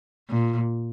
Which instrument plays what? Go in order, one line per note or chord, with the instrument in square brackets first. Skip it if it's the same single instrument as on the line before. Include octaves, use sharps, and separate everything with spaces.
[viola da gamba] A#2